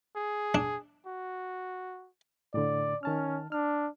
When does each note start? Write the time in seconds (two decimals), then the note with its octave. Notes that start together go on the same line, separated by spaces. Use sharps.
0.16 G#4
0.55 D4
1.06 F#4
2.54 A2 D3 D5
3.03 D#3 C#4 A5 F6
3.52 D4 F6